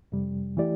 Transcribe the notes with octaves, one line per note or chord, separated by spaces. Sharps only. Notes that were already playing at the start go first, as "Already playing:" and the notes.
F2 C3 G3
E3 A3 E4 G4 D5